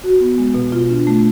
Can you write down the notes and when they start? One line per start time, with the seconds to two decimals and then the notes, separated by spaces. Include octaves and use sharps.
0.04 F#4
0.20 B3
0.38 G#3
0.54 B2
0.72 F4
0.90 D4
1.07 A3